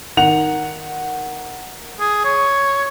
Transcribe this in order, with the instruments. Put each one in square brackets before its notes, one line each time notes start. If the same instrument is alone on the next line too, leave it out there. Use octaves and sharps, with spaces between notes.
[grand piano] D#3 F#5 F7
[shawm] G#4
C#5